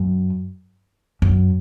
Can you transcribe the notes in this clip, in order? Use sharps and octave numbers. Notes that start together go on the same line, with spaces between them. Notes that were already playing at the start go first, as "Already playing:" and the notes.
Already playing: F#2
F#2